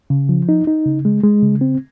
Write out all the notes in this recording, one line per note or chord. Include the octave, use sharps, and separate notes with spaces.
C#3
F3
D#4
D#4
C#3
G#3
G#3
C#3
C4